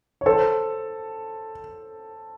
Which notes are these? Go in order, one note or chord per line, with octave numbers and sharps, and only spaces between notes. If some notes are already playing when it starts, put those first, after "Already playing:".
C#5
A4 C5